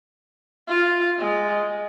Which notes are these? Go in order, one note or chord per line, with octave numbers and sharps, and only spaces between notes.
F4
G#3